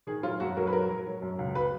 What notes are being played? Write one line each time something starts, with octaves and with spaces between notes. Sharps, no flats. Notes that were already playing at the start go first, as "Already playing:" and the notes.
D#3 G#4
F#3 F4
F#2 F#4
F#3 A#4
B4
F#3 A#4
F#3
F#3
F#2
C#2
F#3 B4